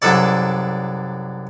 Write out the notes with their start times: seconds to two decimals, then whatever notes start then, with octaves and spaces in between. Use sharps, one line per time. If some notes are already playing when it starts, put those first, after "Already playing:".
0.02 C2 F#2 D4 A4 D5